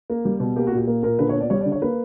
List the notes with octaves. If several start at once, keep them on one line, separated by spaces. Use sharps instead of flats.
A#3
G3 G4
B2
A#3 G4
F#4
A#2
G4
A#3
A#2 A#4
D3 B4
C#5
B3
D5
G3 C#5
D5
D3
C#5
A#3 B4